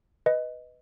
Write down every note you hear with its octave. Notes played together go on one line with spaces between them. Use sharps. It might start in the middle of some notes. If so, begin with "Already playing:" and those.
B4 D#5